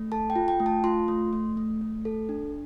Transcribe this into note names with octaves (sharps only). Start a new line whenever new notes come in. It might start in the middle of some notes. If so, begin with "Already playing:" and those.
Already playing: A3
A4 A5
G5
F4
G5
A3
A5
F4 C6
A3
A3
A3
A3
A4
D4